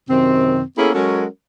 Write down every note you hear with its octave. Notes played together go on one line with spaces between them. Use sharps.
F#2 C3 D#3 C4
A#3 B3 C#4 E4 G#4 A4
F#3 G#3 C#4 F#4 A4 A#4